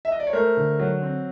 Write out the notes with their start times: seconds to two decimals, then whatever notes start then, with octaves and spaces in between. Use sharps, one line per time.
0.05 E5
0.12 D#5
0.20 D5
0.27 C#5
0.33 A3 A#4 C5
0.57 D3
0.79 F#3
1.02 C4